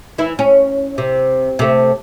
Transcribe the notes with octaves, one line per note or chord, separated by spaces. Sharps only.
E3 E4
C#4
C3
C3 A3